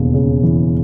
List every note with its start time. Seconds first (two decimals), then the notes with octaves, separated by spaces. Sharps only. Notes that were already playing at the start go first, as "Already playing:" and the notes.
Already playing: E1 D#2 C#3
0.14 C#3
0.43 E3